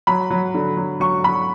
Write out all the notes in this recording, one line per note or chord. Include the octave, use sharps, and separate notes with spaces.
F#3 B5
F#3
D3
F#3
F#3 C#6
F#3 B5